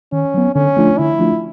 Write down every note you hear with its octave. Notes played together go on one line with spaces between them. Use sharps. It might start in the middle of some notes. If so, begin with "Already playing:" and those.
D#3 C#4
F#3 B3
D3 C#4
F3 A3 D4 F4
D3 E4
F3 A3 D4 F4